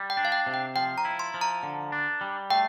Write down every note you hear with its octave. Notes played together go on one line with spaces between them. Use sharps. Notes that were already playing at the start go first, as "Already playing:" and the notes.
Already playing: G3
G5
D4
F5
G5
C3
G5
F3 G5
A#5
E4
C6
F3
A#5
D3
D4
G3
A3 G5